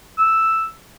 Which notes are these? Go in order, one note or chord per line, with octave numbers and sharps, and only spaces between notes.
E6